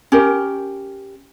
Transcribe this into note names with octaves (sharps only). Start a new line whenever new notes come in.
C#4 G4 A#4